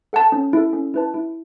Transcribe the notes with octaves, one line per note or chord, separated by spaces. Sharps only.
A4 F#5 A5
C#4
E4 A4
C#4
E4 B4 A5
E4